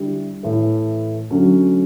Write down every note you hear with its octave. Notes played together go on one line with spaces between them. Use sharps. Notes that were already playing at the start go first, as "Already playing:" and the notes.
Already playing: D3 G3 E4 G4
A2 E3 A3
D3 F#3 A3 C#4